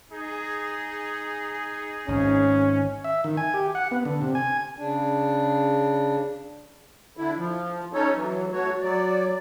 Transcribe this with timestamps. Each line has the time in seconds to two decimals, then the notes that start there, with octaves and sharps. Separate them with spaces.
0.10 D#4 G#4
2.08 G#1 C#4
3.04 E5
3.24 D#3
3.37 G#5
3.54 G4
3.75 F#5
3.91 B3
4.05 D3
4.22 C3
4.35 G#5
4.78 C#3 D4
7.17 D3 E4
7.37 F3
7.93 C#4 D#4 A4 C#5
8.15 E3 F#3
8.52 A3 F#4 C#5
8.82 F#3 D5